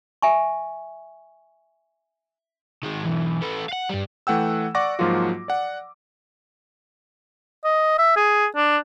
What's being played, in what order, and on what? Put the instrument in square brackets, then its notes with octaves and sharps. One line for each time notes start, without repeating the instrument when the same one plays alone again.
[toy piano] E5 G#5 C#6
[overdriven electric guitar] D#3 G#3
B1 E3
A3 B4
F5 F#5
G2 G3
[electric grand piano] E3 A3 F#5 G5 E6
D5 F#5 C#6 D6 A#6
G#2 F3 F#3 A#3 F4 F#4
D5 F#5
[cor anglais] D#5
E5
G#4
D4